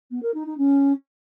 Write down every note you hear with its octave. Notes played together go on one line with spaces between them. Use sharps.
B3
A#4
D#4
D#4
C#4